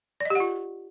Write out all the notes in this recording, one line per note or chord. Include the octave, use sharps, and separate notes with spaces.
F4 G4 D5 D#5 F#5